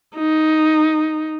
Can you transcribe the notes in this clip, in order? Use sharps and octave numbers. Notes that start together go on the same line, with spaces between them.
D#4